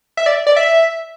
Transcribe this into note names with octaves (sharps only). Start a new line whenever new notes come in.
E5
D5
D5
E5